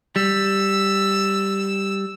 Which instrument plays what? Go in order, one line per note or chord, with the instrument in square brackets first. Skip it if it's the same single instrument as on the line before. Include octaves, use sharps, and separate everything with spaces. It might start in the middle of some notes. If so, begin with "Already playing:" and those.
[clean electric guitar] G3 [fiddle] E6